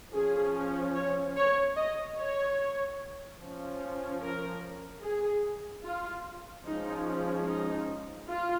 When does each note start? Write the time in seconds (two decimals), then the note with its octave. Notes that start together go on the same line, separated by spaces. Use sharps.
0.13 F3 C#4 G#4
0.95 C#5
1.36 C#5
1.76 D#5
2.17 C#5
3.39 F3 C#4
4.22 A#4
5.03 G#4
5.84 F4
6.65 F3 G#3 C#4 D#4
7.48 D#4
8.29 F4